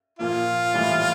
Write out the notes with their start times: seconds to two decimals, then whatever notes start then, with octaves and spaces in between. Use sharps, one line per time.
0.19 A#2 F3 A#3 F4
0.74 A2 E3 G3